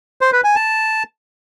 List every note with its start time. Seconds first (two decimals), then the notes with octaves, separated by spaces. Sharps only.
0.21 C5
0.33 B4
0.44 G#5
0.55 A5